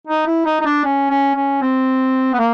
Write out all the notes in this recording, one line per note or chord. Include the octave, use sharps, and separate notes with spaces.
D#4
E4
D#4
D#4
D4
C#4
C#4
C#4
C4
B3
A#3